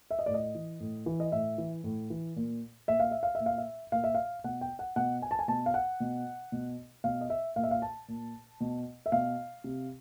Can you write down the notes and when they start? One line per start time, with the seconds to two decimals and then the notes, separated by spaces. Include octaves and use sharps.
0.11 E5
0.19 D#5
0.26 A2 D5
0.34 D#5
0.55 E3
0.80 A2
1.06 E3
1.20 D#5
1.32 A2 E5
1.58 E3
1.84 A2
2.10 E3
2.36 A#2
2.88 A#2 E5
3.00 F5
3.11 E5
3.23 F5
3.35 E5
3.40 A#2
3.46 F5
3.58 E5
3.92 A#2 F5
4.04 E5
4.15 F5
4.44 B2 F#5
4.61 G5
4.79 F#5
4.96 B2 F#5
5.22 G#5
5.31 A5
5.39 G#5
5.48 B2 A5
5.66 F5
5.74 F#5
6.00 B2
6.52 B2
7.04 B2 F5
7.21 D#5
7.30 E5
7.56 A#2 F5
7.63 E5
7.71 F5
7.82 A5
8.08 A#2
8.60 B2
9.06 E5
9.12 B2 F5
9.64 C3